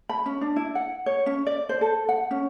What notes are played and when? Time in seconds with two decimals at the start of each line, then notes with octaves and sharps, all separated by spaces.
0.09 B5
0.26 C#4
0.41 D4
0.56 E4
0.75 F#5
1.06 C#5
1.26 C#4
1.46 D5
1.69 C5
1.81 A4
2.09 F#5
2.31 C#4